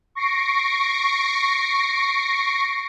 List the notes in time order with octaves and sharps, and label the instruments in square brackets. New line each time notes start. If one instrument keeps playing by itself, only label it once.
[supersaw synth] C#6 A#6 C7 D7